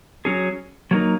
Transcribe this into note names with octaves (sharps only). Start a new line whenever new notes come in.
F#3 C#4 G#4
F#3 A#3 D#4